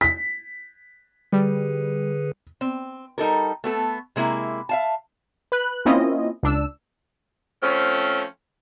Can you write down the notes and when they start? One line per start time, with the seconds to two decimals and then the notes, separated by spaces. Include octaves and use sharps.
0.01 B6
1.32 D3 G3 G#4 B4
2.61 C4
3.18 G3 D#4 A4 A#4
3.64 A3 B3 A4
4.16 C3 G#3 A#3 E4
4.69 E5 F5 A5
5.52 B4 F#6
5.85 A#3 C4 C#4 E4 F4 D#5
6.43 C#2 D4 E6
7.63 F3 A3 C4 C#4